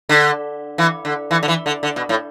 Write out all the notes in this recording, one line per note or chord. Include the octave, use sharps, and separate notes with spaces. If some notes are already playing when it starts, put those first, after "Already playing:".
D3
E3
D3
E3
D3
E3
D3
D3
B2
A2